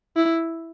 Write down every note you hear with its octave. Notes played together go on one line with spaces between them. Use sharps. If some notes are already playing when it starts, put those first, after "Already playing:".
E4